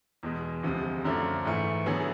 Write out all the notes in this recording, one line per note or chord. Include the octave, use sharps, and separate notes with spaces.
E2 B2 G#3
D2 C3 F3 G#3
F#2 D3 F3 A3 D4
G#2 E3 A3
D3 F#3 B3 E4 G#4